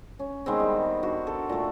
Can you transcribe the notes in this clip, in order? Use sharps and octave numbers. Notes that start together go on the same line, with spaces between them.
C#4
D#3 G#3 B3 C4
G3
D4 F#4
A4 A#4
A#2 A3